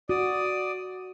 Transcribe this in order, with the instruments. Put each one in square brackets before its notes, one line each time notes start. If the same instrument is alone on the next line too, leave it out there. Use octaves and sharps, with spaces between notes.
[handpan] F#4 [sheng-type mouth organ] D5 D#6